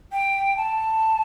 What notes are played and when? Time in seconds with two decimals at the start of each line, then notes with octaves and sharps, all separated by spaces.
0.12 G5
0.57 A5